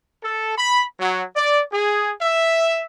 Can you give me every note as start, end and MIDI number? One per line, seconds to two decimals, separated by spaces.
0.23 0.56 69
0.57 0.83 83
0.99 1.23 54
1.36 1.61 74
1.72 2.12 68
2.21 2.84 76